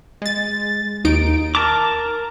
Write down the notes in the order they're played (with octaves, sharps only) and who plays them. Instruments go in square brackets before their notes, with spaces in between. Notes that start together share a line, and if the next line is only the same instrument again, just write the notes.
[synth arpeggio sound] G#3 A6
D#2 D#4 D7
[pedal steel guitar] A#4 A5 D6 [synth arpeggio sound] A#5